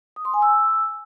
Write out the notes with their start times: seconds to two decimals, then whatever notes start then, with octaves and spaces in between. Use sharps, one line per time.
0.16 D#6
0.25 C6
0.34 G#5
0.42 E6